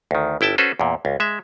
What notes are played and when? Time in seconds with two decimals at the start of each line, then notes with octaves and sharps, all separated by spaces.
0.11 D2 D#3
0.41 G1 E4 G5 A5
0.58 C#4 F#4 A4 B4 C5
0.80 E2 A#2
1.05 C#2
1.20 G#3 E5